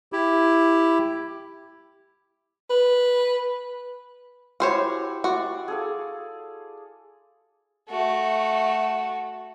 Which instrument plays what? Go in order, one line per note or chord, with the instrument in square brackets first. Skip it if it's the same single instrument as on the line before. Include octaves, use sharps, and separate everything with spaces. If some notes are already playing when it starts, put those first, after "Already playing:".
[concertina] E4 G4
[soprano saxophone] B4
[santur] E4 G4 [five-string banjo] F#4 C5 C#5
[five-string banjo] F#4 [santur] D5 C6
[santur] G#4 A4 F5
[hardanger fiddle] A3 F#4